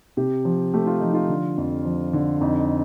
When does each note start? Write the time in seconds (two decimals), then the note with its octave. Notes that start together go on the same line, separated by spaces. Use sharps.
0.17 C3 G4
0.45 F3
0.73 A3 G4
0.86 F4
1.00 F3 D#4
1.14 F4
1.29 D3
1.58 F2
1.85 F3
2.13 D3
2.41 F2 D#4